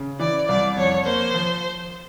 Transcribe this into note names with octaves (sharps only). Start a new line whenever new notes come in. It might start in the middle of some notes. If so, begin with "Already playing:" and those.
Already playing: C#3
E3 D5
C2 D5
F2 C#5
A#3 C5
F3